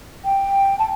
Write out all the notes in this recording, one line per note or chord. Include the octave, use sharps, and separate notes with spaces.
G5
A5